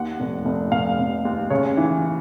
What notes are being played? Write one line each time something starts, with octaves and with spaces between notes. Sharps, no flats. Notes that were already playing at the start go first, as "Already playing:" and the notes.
Already playing: D#2 F#5
F1
F1
F1 F5
F1
D#2
C#3 C#5
E3